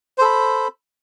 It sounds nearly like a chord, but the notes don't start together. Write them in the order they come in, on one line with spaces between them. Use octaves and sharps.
C5 A4 B5